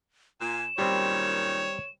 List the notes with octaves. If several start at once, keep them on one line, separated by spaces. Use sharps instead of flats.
A#2 G#5 E7
F#2 A#2 D#3 G3 C4 C#5